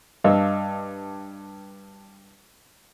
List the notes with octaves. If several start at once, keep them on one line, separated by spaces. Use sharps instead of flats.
G2 D#5 F5 E6